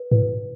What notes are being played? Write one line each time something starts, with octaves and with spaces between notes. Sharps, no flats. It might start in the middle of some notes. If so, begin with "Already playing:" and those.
Already playing: B4
A2 B4